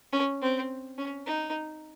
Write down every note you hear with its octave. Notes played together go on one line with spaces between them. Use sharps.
C#4
C4
C#4
D#4